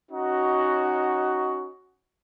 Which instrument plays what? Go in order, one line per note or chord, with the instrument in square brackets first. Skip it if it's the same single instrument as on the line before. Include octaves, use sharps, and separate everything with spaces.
[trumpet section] C#4 D#4 F#4